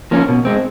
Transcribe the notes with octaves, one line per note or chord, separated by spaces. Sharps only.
F3 A#3 C#4
B2
G#3 C4